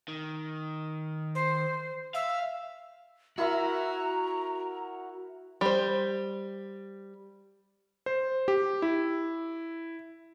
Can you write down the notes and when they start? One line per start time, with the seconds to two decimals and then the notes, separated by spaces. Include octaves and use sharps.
0.08 D#3
1.35 C5
2.14 E5 F5
3.38 E4 F#4 A#4 E5 A#5
5.61 G3 C5
8.06 C5
8.48 G4
8.82 E4